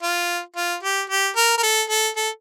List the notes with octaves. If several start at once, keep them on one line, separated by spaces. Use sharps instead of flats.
F4
F4
G4
G4
A#4
A#4
A4
A4
A4